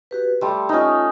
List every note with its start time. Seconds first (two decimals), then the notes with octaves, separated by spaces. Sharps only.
0.11 F#4 G4 B4
0.41 G3 A3 C6
0.69 C#4 D#4 F4 D#6